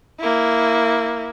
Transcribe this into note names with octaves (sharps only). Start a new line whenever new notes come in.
A#3 E4